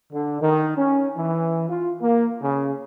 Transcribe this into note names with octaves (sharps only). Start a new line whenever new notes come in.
D3
D#3
C#4
E3
F4
A#3
C#3